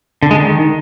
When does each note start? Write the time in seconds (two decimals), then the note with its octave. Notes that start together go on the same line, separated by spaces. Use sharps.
0.23 D3
0.31 G#3
0.39 D#3